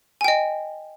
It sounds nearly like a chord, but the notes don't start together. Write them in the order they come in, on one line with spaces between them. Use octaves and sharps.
G#5 G5 D#5